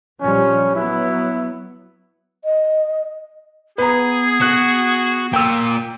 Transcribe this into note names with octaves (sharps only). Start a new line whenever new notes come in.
A#1 F3 G3 C#4
F#3 B3 E4
D#5
B3 G#4 B4 A#5
F#4 F#6
A#2 G5 E6